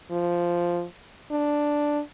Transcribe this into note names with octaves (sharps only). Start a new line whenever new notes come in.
F3
D4